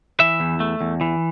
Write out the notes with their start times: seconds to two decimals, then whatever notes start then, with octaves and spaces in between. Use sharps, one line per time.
0.20 E3 E5
0.40 E2
0.60 A3
0.81 E2
1.01 E3